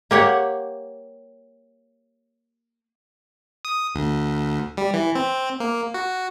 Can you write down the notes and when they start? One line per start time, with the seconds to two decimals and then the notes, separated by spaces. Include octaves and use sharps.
0.11 A#3 G4 C#5 F#5
3.65 D#6
3.95 D2
4.77 G3
4.94 E3
5.16 C4
5.60 A#3
5.94 F#4